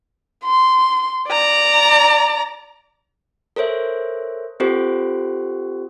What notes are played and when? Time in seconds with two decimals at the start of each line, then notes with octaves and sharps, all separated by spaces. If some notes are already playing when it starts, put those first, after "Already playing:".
0.45 C6
1.29 D5 A#5
3.56 A4 A#4 C5 C#5 E5
4.60 C4 F4 G4 A4 C5